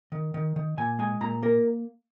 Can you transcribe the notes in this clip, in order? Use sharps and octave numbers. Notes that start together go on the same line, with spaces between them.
D#3
D#3
D#3
A#2 G#5
G#3 G#5
A#2 A#5
A#3 A#4